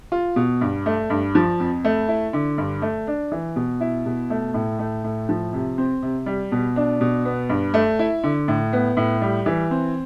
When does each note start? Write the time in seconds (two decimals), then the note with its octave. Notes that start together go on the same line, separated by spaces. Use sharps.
0.12 F4
0.36 B2
0.61 G2
0.86 A3
1.10 G2
1.35 F3
1.60 F2
1.85 A3
2.09 E4
2.33 D3
2.58 G2
2.82 A3
3.07 D4
3.32 E3
3.56 B2
3.81 E4
4.06 B2
4.30 A3
4.54 A2
4.79 A3
5.04 A2
5.29 F3
5.53 C3
5.78 C4
6.02 C3
6.26 G3
6.52 B2
6.76 D4
7.01 B2
7.25 B3
7.49 G2
7.74 A3
7.99 E4
8.24 D3
8.48 A2
8.73 B3
8.97 A2
9.22 G3
9.46 E3
9.71 C4